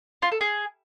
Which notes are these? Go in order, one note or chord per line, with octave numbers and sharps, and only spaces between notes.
F4
A4
G#4